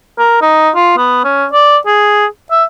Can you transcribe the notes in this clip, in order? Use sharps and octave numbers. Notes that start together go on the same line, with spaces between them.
A#4
D#4
F4
B3
C#4
D5
G#4
E5